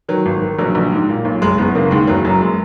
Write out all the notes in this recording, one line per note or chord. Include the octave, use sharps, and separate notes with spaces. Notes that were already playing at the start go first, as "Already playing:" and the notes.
D#3 F#3
G#1
D#3
A#1 F#3
A#1
G#2
A#2
B1
F#1 G#3
F#1 B3
C#3 A#3
D#2 G#3
F#1 F#3
F#2 F#3
G#3